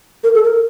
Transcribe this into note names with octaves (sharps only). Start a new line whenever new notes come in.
A#4
A4
A#4